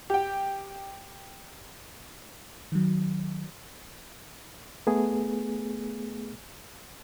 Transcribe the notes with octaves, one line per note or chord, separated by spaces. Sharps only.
G4 G5
D#3 F#3
A3 B3 G#4